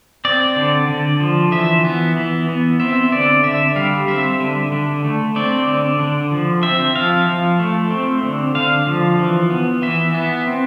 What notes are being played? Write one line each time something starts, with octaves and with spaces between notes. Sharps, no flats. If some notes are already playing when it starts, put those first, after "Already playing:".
C4 D5
D3
D3
F3
E3 E5
B3
E3
B3
C4 E5
D3 D5
D3 E5
G3 F5
C4 E5
D3
D3
A3
C4 D5
D3
D3
F3
C4 E5
F3 F5
F3
A3
C4
D3
D3 F5
F3
E3
B3
E3 E5
B3
C4